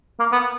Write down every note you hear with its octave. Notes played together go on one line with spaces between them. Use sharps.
A#3
B3